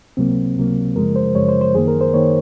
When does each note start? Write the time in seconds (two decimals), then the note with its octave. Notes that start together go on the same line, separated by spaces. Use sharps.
0.17 C#2 C3 F#3 A#3 C4
0.56 C#2 C3 F#3 A#3
0.96 F#2 C#3 F3 G#3 A#4
1.16 C5
1.35 F#2 C#3 F3 G#3 C#5
1.49 C5
1.61 C5
1.75 F#2 D#3 A#3 G#4
1.88 A#4
2.01 C5
2.14 D#3 A#3 C#5